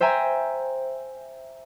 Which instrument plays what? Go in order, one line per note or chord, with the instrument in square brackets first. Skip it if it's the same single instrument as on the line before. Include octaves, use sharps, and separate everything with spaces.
[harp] C5 E5 G5 G#5 A#5